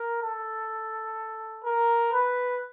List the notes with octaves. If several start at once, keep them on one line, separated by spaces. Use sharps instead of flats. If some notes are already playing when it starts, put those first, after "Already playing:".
Already playing: A#4
A4
A#4
B4